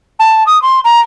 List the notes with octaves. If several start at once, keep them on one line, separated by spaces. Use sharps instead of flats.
A5
D#6
C6
A#5